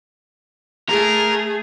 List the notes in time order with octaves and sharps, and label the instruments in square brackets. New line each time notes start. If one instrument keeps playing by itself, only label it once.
[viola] A3 G#4 [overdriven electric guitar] A#4